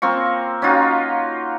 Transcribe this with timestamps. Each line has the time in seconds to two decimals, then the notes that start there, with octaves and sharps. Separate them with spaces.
0.02 A#3 C4 F4 C#6
0.62 C#4 D#4 F4 F#4